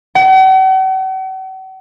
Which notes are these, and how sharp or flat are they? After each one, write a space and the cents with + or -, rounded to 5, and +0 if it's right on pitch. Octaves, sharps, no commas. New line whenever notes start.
F#5 +45